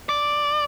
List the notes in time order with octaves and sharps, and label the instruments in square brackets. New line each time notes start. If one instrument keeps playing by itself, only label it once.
[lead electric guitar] D5